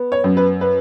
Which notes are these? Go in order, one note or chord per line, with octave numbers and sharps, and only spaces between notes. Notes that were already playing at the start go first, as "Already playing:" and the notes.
Already playing: B3
C#5
F#2
B4
B4